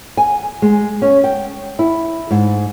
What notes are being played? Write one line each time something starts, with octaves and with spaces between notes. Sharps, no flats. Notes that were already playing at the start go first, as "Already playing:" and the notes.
G#5
G#3
C#4
G5
E4
G#2